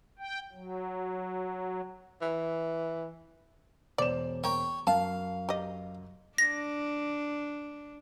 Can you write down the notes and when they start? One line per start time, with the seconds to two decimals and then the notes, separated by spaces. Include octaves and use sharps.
0.19 G5
0.52 F#3
2.22 E3
3.98 E1 C5 D5 E7
4.44 A#3 C#5 G5
4.87 F#2 F5 A5
5.49 G4 D#5
6.38 D4 A#6